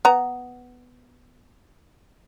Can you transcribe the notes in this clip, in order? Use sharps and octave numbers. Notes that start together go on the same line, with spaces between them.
B3 A#5